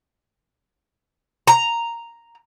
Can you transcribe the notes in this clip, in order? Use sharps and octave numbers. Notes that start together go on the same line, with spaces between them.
A#5